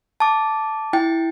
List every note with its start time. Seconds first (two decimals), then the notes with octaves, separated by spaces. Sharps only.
0.20 A5 D6
0.93 E4 G5